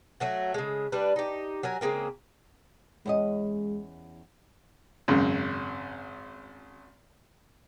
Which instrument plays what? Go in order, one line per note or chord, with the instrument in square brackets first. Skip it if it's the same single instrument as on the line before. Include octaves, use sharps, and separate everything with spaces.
[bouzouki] F#3 A3 F#4
C#3 G#3
G3 D4 B4
D#4 G4
F#3 A#4 G#5
C#3 G#3 A#3 C4
[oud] E2 C#4 D#5 [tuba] G#3
[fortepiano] G#1 F#2 C#3